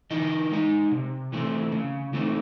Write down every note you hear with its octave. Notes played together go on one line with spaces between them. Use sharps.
E3 D#4 D#5
G#3 D#4
C3
E3 A3 C4
C#3
E3 A3 C4 D#4